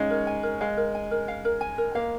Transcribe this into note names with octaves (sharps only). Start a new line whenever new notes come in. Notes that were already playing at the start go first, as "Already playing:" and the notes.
Already playing: G#3 C#4 D#4 F5
A#4
G#5
A#4
G#3 F5
A#4
G#5
A#4
F5
A#4
G#5
A#4
A#3 F5